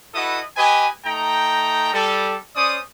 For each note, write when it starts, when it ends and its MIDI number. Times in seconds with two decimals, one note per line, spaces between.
0.14 0.40 64
0.14 0.40 66
0.14 0.40 69
0.14 0.40 71
0.14 0.40 75
0.14 0.40 87
0.57 0.87 67
0.57 0.87 71
0.57 0.87 75
0.57 0.87 80
1.05 1.90 57
1.05 1.90 63
1.05 1.90 79
1.05 1.90 82
1.93 2.36 55
1.93 2.36 69
2.56 2.77 61
2.56 2.77 72
2.56 2.77 74
2.56 2.77 87